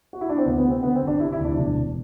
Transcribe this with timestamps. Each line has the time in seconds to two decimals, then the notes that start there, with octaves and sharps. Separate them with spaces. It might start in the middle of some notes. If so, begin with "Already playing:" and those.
0.13 F#4
0.21 E4
0.29 D4
0.38 C4
0.45 D2 B3
0.58 B3
0.64 C3
0.70 C4
0.83 D3 B3
0.96 C4
1.02 G1
1.07 D4
1.20 C3 E4
1.33 E4
1.38 D2
1.45 D4
1.57 E1 D4
1.76 E1